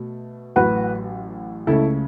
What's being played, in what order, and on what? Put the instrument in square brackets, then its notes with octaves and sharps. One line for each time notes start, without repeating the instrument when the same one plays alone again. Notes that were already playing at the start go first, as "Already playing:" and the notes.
Already playing: [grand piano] B2 A3
[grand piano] A1 A2 F#3 [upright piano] F#4 B4
[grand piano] C#2 C#3 A3 C#4 [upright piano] E4 A4